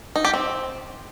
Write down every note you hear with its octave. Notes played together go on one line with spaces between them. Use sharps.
D#4
G4
C4